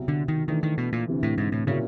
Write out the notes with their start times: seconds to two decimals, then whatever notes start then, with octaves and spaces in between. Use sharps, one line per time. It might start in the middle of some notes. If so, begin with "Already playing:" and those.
Already playing: C2 B2 F#3
0.08 D3
0.28 D#3
0.48 D#3 E3 A3 D4
0.63 D#3
0.78 B2
0.93 A#2
1.08 D2 C3 E3
1.23 A2
1.38 G#2
1.52 A2
1.67 A#2 C#3 F#3 A#3 C#4 E4